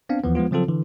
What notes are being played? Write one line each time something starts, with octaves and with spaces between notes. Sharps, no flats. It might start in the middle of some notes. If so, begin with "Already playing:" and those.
B3 C4 D4 F5
D#2 E3 F3 B3
F3 G#3 B3 F4
C#3 F3 F#3 C4 F4 A4
D3 E3